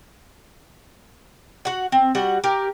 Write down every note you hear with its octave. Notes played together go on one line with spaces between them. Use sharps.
F#4 F#5
C4
G3 F#4 F#5
G4 A#4